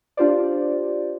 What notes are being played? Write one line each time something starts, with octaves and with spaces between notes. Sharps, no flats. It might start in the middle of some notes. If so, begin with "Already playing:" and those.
D4 F4 G4 C5 D5